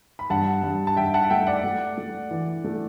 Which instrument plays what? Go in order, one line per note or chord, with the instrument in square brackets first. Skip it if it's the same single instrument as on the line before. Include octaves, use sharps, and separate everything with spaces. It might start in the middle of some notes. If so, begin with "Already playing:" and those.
[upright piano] B5
[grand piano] G2 [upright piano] F#5 A5
[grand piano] G2
[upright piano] A5
[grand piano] G2 [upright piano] E5 G5
[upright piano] F#5 A5
[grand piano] A3 [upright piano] E5 G5
[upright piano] D5 F#5
[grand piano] A3
A3
E3
A3